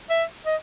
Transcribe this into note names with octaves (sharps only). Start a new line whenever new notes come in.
E5
D#5